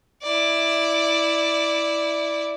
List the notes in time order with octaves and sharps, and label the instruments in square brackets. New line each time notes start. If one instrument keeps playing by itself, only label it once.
[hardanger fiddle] E4 D5